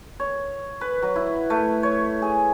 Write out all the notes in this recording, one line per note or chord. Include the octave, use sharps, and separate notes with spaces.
C#5
B4
F#3
E4
A3
C#5
G#4